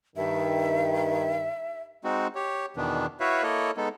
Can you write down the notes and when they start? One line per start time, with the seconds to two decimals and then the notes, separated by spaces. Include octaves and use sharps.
0.16 G2 D#3 E5
2.04 G#3 C4 D#4 F#4
2.35 G4 C#5
2.77 E2 B2 D#3 E3 B3 D4
3.20 E4 F#4 B4 C#5 E5 F5
3.43 A#3 E4 A4 C#5 D#5
3.77 G#3 B3 D#4 A4